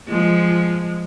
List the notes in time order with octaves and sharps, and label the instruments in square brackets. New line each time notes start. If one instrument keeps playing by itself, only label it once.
[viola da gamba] F3 G#3